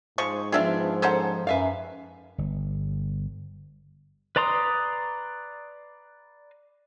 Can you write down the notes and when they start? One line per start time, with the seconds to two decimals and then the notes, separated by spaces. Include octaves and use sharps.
0.18 G#2 F3 G#3 C#6
0.52 F3 B3 D4 F4 G#4 E5 F5
1.02 C#4 A4 A#4 C5 F#5
1.47 F#2 B4 E5 F5
2.38 G1
4.36 B4 D5 A#5 C6 D#6